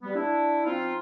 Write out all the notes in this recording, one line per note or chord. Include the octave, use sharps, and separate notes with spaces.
G3 B3
D4 E4
F3 B3 C4 D#4 F4